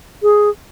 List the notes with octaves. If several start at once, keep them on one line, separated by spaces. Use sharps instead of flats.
G#4